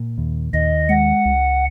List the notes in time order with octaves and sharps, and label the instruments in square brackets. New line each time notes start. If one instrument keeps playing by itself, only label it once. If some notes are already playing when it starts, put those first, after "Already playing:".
Already playing: [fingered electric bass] A#2
D#2
[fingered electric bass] D#2 [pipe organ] D#5
[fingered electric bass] G#3 [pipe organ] F#5
[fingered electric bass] C#2